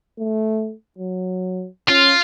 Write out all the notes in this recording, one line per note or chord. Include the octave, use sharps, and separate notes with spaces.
A3
F#3
C#4 F4